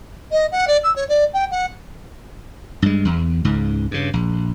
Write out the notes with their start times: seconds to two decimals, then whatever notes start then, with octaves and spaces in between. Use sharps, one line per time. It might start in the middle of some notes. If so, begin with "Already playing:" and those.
0.31 D#5
0.52 F#5
0.67 D5
0.83 E6
0.96 C#5
1.09 D5
1.33 G5
1.51 F#5
2.82 G2 G#3
3.05 E2
3.45 C#2 G#2
3.91 G2 C#3
4.13 A#1